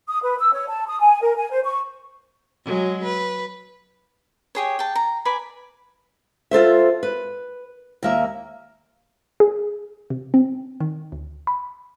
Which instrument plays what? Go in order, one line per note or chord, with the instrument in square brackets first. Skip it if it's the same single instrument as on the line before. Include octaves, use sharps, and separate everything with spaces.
[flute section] D#6
B4
E6
C#5
A5
D#6
G#5
A#4
G#5
C5
C#6
[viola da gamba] F#3 G#3
B4
[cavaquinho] G4 G#4 C#5
G5 A5
A#5
B4 D5 G#5 B5
[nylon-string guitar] F4 A4 C5 E5
B4
D#2 A#3 E5
[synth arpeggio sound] G#4
C3
C4
D#3
D2
B5